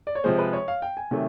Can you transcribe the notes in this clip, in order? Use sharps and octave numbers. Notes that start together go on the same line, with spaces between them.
D5
C#5
C3 F3 G#3 C5
B4
C#5
F5
G5
G#5
C3 D#3 F#3 A3